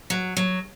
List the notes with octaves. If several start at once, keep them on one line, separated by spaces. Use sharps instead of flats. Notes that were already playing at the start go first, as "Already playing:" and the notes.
F#3
F#3